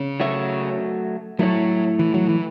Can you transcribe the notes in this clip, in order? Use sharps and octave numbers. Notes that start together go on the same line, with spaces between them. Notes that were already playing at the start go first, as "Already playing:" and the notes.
Already playing: C#3
F#3 A3 F#4 C#5 E5
A2 F#3 A3 E4 C#5
E3
F#3
E3